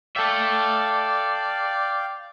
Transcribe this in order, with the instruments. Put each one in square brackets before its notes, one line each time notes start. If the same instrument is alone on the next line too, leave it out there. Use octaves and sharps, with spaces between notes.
[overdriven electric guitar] A4 E5 [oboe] D5 [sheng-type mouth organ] F5 G5